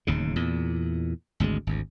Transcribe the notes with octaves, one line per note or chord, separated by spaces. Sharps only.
D1 D#2 C#3
E2 A#2
G#1 D2 C3 G#3
G#1 D2